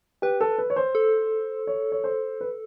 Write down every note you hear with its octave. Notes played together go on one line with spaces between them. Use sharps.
G4 B4
A4
B4
C#5
C5
A4
C#5
C#5
C5
B4